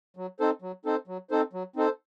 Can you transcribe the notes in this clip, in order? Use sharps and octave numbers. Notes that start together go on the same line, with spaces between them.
F#3
C4 D#4 A4 C5
F#3
C4 D#4 A4 C5
F#3
C4 D#4 A4 C5
F#3
C4 D#4 A4 C5